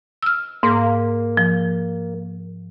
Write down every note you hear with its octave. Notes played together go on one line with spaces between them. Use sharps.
E6 F6
G#2 A#3
F3